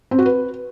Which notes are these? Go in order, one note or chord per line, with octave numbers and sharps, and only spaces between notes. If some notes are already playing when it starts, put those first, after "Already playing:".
C4
F#4
B4